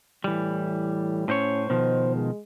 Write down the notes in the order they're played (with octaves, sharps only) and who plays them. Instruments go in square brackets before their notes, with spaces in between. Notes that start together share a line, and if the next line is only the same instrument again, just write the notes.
[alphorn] A2 [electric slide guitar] E3 G3
[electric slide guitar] A2 C5 C#5 [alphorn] C#4
[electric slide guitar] B2 D#3 F3 [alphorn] C5
[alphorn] G#3